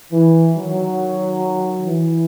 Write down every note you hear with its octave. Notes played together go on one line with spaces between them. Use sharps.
E3
D#3 F#3
E3